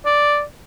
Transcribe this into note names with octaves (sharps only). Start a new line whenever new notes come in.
D5